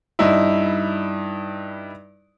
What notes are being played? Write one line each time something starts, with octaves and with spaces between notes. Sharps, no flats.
G2 D#4 E4